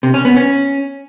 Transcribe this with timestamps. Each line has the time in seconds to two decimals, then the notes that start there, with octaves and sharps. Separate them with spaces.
0.03 C3
0.14 C#4
0.25 B3
0.36 C#4